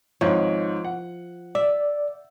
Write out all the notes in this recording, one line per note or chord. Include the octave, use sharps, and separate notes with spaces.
G#1 G#2 F3 C#5
F#5
D5 E5